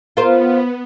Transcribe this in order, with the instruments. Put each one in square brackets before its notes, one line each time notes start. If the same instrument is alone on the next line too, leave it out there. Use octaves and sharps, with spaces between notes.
[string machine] B3 [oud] F4 A#4 C5